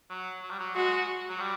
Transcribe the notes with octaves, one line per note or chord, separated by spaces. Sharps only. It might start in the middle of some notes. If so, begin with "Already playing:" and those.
F#3
F#3
G3
F#3
G#3 F#4
F#3
G3